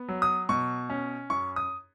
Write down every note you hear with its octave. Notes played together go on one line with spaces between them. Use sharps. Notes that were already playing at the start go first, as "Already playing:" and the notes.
Already playing: B3
F#3
D#6
B2 C#6
C#4
F#2 C#6
D#6